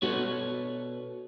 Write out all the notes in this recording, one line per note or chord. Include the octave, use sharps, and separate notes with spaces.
B2 D4 F#4 A4 B4 C#5